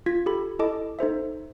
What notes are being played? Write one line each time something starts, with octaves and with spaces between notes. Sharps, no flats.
F4 G#6 B6
G4 A4 B5
E4 A4 D#5 A5 D6
D#4 A4 C5 E5